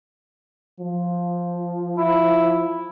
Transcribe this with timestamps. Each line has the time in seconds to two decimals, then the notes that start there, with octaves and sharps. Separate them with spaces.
0.80 F3
1.98 E4